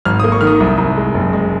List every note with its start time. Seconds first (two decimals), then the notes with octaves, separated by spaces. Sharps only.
0.05 G#1 F6
0.20 A#3 D#6
0.32 C#6
0.41 D#3 F6
0.47 D#6
0.60 C2
0.78 C2
0.97 G#3
1.14 F#1
1.33 G#3